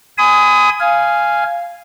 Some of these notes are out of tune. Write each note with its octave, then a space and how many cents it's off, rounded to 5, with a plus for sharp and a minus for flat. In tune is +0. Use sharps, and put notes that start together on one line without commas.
G#5 +0 B5 +45 D#6 +15
F5 -10 G#5 +0